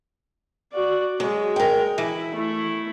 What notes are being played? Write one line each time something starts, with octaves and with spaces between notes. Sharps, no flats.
F#4 D5
F#3 G#3
A#4 G5
E3 E4
A3 E4